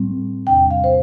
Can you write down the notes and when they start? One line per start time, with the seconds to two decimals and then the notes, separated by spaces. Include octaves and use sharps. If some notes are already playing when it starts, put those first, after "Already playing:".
Already playing: A2 G3 C4
0.47 E2 C3 G3 D4 G5
0.70 F5
0.84 C5